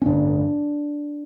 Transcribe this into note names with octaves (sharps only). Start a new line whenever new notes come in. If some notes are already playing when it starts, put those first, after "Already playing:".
C#4
A1 G2 D3 D4